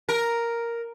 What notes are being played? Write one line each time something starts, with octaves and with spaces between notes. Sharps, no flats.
A#4